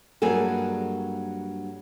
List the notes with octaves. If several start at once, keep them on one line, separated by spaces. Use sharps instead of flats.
G2 F#3 A#3 G#4 A4